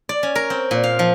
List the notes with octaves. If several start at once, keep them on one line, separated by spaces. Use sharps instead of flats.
D5
C#4
A#4
C4
A#2
F5
F3